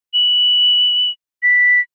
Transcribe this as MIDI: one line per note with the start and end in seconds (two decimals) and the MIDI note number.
0.14 1.10 102
1.43 1.80 95